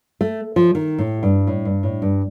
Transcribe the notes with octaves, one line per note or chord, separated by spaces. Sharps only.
A3
F3
D#3
A2
G2
A2
G2
A2
G2